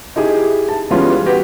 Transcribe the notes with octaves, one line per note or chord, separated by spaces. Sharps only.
D#4 E4 G4 G#4
A5
E3 G3 G#3 B3 C#4 F4
F#4 G4 B4